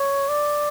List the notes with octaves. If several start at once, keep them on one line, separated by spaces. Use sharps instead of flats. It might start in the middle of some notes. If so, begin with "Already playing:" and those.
Already playing: C#5
D5